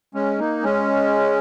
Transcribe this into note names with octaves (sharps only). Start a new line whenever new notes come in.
G#3 C#4
A#3 D#4
G#3 C#4